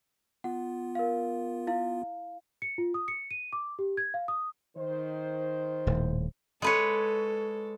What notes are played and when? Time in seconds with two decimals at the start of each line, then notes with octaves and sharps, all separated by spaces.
0.44 B3 F4 F#5
0.95 A#4 F5
1.67 E4 F5
2.62 C#7
2.78 F4
2.94 D#6
3.08 C#7
3.31 D#7
3.53 D6
3.79 G4
3.97 G#6
4.14 F5
4.28 D#6
4.76 D#3 C5
5.87 D#1 A2
6.62 G#3 A4 B4 C#5